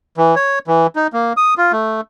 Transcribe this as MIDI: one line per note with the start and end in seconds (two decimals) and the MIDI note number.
0.17 0.35 52
0.36 0.59 73
0.67 0.87 52
0.96 1.07 63
1.13 1.33 58
1.37 1.54 87
1.58 1.72 65
1.72 2.01 57